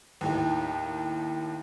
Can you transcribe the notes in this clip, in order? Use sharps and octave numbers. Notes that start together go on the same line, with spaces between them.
D#2 A2 D#3